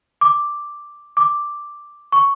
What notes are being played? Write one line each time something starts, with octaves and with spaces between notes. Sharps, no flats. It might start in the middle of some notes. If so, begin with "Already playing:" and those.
D6
D6
C#6